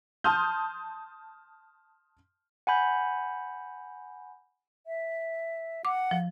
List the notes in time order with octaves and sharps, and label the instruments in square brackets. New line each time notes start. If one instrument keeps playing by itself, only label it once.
[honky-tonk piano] A5 C6 D#6 F6 G6
[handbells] F#5 G#5 B5 G6
[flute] E5
[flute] F#5 [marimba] D6
[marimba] F3